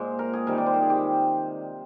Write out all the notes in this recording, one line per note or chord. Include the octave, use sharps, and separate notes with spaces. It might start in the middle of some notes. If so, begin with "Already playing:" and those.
Already playing: A#2 G#3 F4 G#4 C5
A#4
G#4
C3 D#3 G3 A#4
D5
C5
A#4
G#4
G4